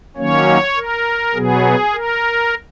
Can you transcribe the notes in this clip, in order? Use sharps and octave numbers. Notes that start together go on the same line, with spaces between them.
D#3 F#3 A#3 C#4 C#5
A#4
B2 F#3 B3 G#4
A#4